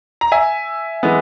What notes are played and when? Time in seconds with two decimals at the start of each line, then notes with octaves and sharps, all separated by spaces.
0.21 A#5
0.32 E5 G#5
1.03 E3 G#3 B3